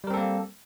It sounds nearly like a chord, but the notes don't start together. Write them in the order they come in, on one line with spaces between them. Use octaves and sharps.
G3 A#4 C4 A4 A#3